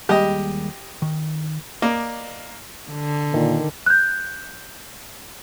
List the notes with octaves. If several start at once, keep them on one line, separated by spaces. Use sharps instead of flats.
D#2 G3 G#3 G4 D#5
D#3
A#3 D5 D#5
D3
A#2 D#3
F#6 G6